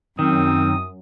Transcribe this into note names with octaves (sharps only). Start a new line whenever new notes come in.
F#2 D#3 C4 D#6